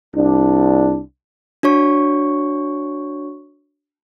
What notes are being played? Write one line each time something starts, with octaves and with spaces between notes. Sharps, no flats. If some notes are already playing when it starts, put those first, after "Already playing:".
C2 D4
D4 F#4 C#5 C#6